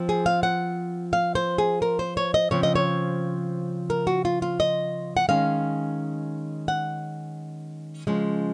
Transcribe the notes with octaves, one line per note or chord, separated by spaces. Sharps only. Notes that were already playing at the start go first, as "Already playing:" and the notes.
Already playing: F3 C4
G#4
F5
F#5
F5
C5
G#4
A#4
C5
C#5
D#5
C#3 F3 C4 C#5
D#5
C#5
A#4
F#4
F4
F4
D#5
F#5
D#3 G#3 C#4 F5
F#5
C#3 F3 G#3 C#4